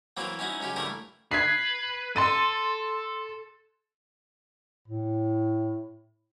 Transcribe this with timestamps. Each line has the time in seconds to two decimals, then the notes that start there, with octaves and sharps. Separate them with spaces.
0.17 E3 F#3 A#3 C4 E4
0.39 C#4 D#4 E4 F#4
0.60 C#2 F#3 C#4 G4
0.76 G2 E3 A3 E4 A#4
1.31 B4 G#6 B6 C7
2.16 A4 C6 A6 D#7
4.88 A2